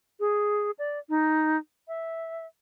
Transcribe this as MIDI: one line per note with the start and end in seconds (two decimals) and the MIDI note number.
0.20 0.71 68
0.79 0.99 74
1.09 1.57 63
1.88 2.46 76